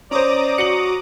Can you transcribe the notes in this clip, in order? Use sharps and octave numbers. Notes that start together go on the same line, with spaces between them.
C#4 C5 D5 A#5 D6 D#6
F#4 C#7 F#7